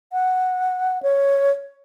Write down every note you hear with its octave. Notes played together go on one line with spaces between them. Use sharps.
F#5
C#5